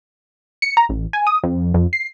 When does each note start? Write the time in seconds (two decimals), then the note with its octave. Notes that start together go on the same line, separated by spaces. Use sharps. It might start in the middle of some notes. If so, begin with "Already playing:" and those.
0.62 C#7
0.77 A#5
0.89 A1
1.13 G#5
1.27 D#6
1.43 F2
1.74 F2
1.93 C7